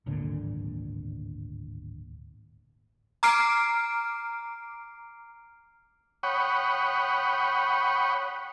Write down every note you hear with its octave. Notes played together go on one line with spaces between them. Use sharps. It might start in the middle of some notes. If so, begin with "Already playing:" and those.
D1 G#1 A#2 D3
A#5 D6 F6 C7 D7
C#5 F#5 G5 B5 C#6 D#6